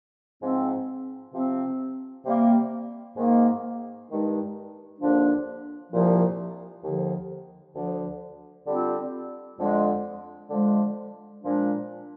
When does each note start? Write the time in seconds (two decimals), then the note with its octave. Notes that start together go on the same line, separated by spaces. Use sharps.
0.41 G#2 F3 C4
1.32 C3 F3 C4
2.24 C3 G3 A#3
3.17 G#2 D#3 A#3
4.08 G2 D#3 G#3 D#4
4.99 D#2 D3 F3 A#3 D4
5.92 C2 A#2 F3
6.83 D#2 D3 F3
7.75 D2 D3 F3
8.66 D3 G3 C4 F4
9.58 F2 D3 G#3
10.49 D3 F3 G#3
11.42 A#2 F3 G#3 D4